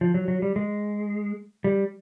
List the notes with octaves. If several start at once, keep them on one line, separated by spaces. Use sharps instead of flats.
F3
F#3
F#3
G3
G#3
G3